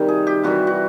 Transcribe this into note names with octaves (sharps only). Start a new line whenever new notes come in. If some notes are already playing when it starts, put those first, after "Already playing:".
Already playing: C3 D#3 G3
G#4
G4
C3 E3 G3 F#4
F#4